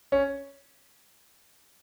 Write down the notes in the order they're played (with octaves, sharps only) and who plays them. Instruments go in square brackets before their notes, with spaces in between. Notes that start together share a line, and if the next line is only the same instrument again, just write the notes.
[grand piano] C#4